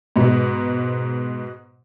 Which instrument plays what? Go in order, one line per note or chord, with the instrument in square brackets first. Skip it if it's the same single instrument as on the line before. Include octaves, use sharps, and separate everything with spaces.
[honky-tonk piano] G#2 B2